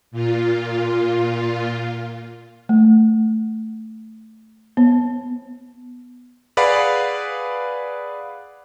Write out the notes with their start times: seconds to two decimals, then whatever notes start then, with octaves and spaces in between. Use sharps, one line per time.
0.11 A#2 F4
2.69 A3
4.77 B3
6.57 G#4 B4 D5 F5 F#5 B5